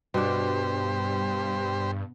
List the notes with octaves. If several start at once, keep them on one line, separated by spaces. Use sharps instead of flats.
G2 B2 D4 G4 C5